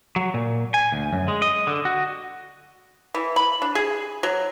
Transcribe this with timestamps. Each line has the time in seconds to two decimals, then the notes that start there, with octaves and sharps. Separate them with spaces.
0.16 F#3
0.34 A#2
0.74 G#5
0.92 D2
1.13 F#2
1.28 G#3
1.42 D#5
1.67 D3
1.85 F#4
3.14 E3
3.36 B5
3.62 D4
3.75 G#4
4.23 F#3